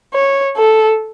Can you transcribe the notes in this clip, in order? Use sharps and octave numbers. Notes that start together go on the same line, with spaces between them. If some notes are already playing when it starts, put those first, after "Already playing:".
C#5
A4